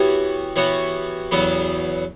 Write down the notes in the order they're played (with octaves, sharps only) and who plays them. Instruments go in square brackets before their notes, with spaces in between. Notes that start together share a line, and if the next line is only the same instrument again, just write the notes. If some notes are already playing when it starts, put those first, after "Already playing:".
Already playing: [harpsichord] E3 B3 F#4 C#5 [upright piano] G4
[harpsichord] E3 B3 F#4 C#5
E2 C#3 F#3 B3